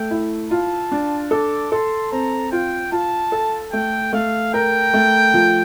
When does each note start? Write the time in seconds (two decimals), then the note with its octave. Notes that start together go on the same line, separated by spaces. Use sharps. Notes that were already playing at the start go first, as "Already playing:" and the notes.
Already playing: A3 G5
0.11 E4
0.51 F4 A5
0.92 D4
1.31 A4 D6
1.72 A4 C6
2.11 C4 A#5
2.52 F4 G5
2.92 F4 A5
3.32 A4
3.72 A3 G5
4.13 A3 F5
4.54 A#4 G5
4.94 A3
5.34 F3